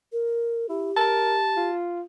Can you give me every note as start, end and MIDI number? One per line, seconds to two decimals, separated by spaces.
0.12 0.66 70
0.69 0.92 64
0.69 1.70 67
0.97 1.37 70
0.97 1.74 81
1.57 2.02 65